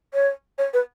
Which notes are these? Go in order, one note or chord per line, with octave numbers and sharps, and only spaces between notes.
C#5
C#5
B4